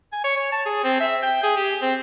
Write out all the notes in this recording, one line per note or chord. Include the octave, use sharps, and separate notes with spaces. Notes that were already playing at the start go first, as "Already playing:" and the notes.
G#5
C#5
C#5
A5
G#4
C4
E5
G5
G#4
G4
C4